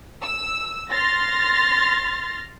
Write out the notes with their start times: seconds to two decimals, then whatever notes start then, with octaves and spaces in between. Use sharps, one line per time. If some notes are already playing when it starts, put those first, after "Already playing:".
0.24 E6
0.90 C6 F6 A6 A#6